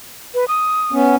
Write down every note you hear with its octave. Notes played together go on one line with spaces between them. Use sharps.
B4
D#6
B3 C#4